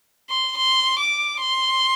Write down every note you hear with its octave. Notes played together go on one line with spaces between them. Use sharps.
C6
C6
D6
C6